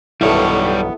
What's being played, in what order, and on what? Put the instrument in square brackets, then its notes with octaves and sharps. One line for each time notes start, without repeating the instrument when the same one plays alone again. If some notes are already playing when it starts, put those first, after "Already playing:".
[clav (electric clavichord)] B1 G2 D#3 [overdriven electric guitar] G3 C#5 [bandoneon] B3 [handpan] E4 A4